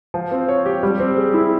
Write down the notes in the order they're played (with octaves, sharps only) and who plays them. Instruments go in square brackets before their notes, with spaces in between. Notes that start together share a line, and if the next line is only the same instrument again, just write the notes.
[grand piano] F3
C4
C#5
G4
G3
C4
G#4
E4